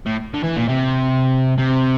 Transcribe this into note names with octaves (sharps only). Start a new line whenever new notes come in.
A2
D3
E3
A#2
C3
C3